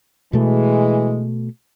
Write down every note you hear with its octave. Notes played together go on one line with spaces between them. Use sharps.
B2 E3 G#3 A3